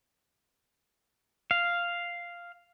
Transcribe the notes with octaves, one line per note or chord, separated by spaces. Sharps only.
F5